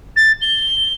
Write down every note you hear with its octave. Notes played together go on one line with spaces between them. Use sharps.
A6
G7